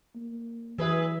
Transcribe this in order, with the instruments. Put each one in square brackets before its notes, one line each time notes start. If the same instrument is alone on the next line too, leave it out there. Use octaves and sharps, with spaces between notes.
[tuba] A#3
[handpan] E3 E5 [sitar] F#3 G#4 B4